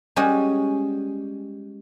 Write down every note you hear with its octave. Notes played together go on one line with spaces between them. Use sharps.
G3 G#3 C#4 F#4 D#5